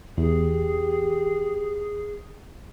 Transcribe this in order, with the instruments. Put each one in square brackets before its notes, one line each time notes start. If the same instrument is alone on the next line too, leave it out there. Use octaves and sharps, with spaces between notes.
[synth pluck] E2 [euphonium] G4 [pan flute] G#4